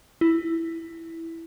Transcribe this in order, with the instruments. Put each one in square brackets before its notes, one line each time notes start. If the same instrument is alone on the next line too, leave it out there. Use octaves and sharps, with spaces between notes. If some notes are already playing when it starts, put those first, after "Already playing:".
[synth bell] E4